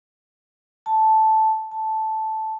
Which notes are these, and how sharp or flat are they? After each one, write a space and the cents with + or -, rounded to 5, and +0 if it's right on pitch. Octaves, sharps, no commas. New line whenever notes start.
A5 -5
A5 -5